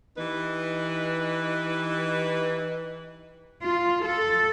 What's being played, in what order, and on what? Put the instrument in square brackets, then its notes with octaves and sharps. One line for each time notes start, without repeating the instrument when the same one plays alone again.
[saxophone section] E3 D#4 G4 B4
[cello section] F4
A4